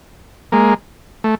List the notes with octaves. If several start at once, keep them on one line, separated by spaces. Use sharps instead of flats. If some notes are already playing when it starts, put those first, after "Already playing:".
G#3 A#3
A3